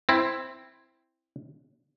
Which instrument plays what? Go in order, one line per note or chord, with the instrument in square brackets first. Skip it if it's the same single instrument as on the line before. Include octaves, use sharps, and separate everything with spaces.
[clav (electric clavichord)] C4 E4